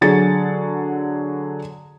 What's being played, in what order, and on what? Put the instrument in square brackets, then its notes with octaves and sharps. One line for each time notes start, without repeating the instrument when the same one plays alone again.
[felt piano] D3 F#3 G#4 A6 C#7